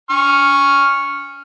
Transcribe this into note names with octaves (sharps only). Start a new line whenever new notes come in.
C#6 F6